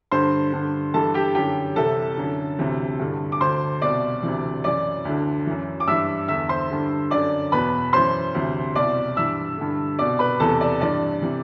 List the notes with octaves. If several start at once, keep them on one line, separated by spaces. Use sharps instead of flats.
G2 D3 C5 C6
G2 D3
G2 E3 A4 A5
G4 G5
F#2 D3 G4 G5
C2 C3 E3 A4 A5
F#2 D3
D2 C3 E3
G2 D3
D6
D2 D3 C5 C6
C2 B2 D5 D6
D2 C3 E3
F#2 E3 D5 D6
D2 D3
F#2 E3
D6
G2 E3 E5 E6
E2 D3 E5 E6
C5 C6
G2 D3
F#2 D3 D5 D6
E2 B2 B4 B5
F#2 E3 C5 C6
D2 C3 E3
C2 B2 D5 D6
G2 E3 E5 E6
G2 D3
C2 B2 D5 D6
B4 B5
E2 C3 E3 A4 A5
D5
G2 E3 D5
C3 E3